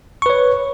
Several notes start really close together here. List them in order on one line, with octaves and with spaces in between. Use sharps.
C#6 B4 C#5